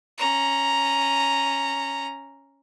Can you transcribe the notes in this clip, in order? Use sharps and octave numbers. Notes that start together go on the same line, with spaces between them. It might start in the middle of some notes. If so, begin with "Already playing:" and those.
C#4 A#5